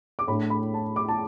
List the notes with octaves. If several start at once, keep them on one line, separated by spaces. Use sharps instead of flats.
D6
A2 A3 D4 B5
B5
A5
D6
A5